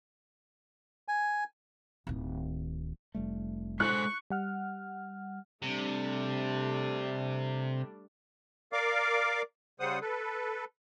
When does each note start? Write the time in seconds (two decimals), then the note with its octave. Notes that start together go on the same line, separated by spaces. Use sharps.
1.08 G#5
2.07 D1 D#3
3.15 F1 G3 A3
3.80 G#3 A4 C5 C#6 F#6
4.30 G3 F#5 F6
5.62 C3 G3 A3 D4
8.73 A#4 D5 F5 D6
9.80 C#3 G3 C5 F#5 D#6
10.01 A4 B4